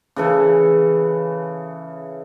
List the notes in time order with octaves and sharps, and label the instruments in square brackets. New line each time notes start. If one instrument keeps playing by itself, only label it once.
[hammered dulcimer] C#3 E3 A4